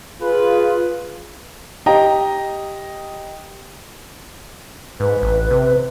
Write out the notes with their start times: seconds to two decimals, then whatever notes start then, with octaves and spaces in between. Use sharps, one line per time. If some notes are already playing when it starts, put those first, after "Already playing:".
0.22 F4 G#4 B4
1.86 G4 D#5 G5 A#5
5.00 G#2 B4
5.22 A1
5.51 C3